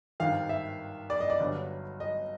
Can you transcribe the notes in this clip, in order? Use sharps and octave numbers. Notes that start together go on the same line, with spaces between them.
G#1 G2 D#3 F5
E5
D5
D#5
D5
G1 G2 D3 F#3
D#5